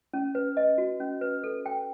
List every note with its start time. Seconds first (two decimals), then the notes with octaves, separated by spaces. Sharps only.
0.13 C#4
0.35 B4
0.57 D#5
0.78 F#4
1.00 C#4
1.21 B4
1.44 A4
1.66 G5